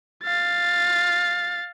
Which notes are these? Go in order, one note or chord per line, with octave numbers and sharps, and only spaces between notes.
F5 A6